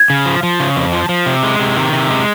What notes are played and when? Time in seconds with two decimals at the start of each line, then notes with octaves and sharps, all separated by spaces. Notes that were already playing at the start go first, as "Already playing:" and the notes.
Already playing: G#6
0.10 C#3
0.26 F3
0.43 F3
0.60 C#3
0.76 F2
0.92 F3
1.09 F3
1.26 C3
1.43 G#3
1.59 C3
1.76 D#3
1.93 C3
2.10 G#3